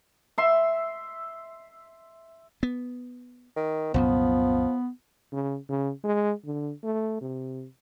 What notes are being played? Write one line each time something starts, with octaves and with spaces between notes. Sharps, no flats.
E5 C6
B3
D#3
C2 F#2 A#2 F3 B3
C#3
C#3
G#3
D3
A3
C3